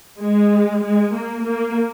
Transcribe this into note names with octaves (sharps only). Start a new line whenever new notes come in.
G#3
G#3
A#3
A#3